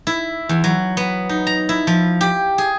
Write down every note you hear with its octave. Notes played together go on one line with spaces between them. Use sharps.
E4
E2
F#3
B3
D#4
A#5
E4
F3
G4
G#4